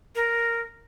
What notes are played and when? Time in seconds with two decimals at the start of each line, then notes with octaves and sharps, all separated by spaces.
0.15 A#4